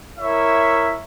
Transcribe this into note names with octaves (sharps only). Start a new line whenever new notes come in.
E4 A#4 C#5 E5